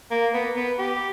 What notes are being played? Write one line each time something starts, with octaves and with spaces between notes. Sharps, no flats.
A#3
B3
B3
G4